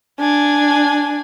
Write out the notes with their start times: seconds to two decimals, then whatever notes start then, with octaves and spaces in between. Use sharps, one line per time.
0.20 D4 G#5